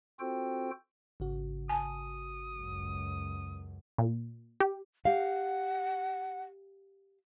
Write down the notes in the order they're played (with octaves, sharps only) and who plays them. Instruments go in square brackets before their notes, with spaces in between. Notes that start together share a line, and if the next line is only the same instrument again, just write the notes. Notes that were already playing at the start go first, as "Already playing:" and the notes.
[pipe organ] C4 F4 F#4 A4 C5 G5
[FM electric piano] G#1 C#3 F#4
[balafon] G#5 A5 [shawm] D#6
[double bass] C#2 F#2
[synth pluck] A#2
G4
[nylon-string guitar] G4 F5 [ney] F#5